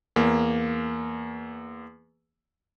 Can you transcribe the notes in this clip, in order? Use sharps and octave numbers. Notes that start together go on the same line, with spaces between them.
E2 A#3